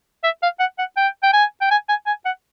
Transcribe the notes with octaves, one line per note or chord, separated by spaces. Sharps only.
E5
F5
F#5
F#5
G5
G5
G#5
G5
G#5
G#5
G#5
F#5